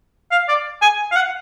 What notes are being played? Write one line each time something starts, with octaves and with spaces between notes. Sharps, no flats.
F5
D5
G#5
F5
F#5